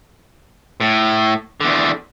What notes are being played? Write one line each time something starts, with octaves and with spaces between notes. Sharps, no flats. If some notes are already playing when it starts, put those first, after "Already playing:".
A2
E2 D3